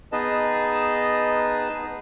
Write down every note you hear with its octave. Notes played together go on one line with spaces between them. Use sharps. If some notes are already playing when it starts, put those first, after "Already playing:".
B3 D#4 G#4 B4 D#5 A5